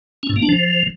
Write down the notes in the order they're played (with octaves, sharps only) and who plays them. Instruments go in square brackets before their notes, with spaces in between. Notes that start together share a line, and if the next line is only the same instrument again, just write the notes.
[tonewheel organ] C#4
A2
A#3
D4
F3